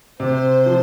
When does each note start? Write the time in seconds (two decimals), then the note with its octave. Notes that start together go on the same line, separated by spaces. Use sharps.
0.20 C3 C5
0.66 F3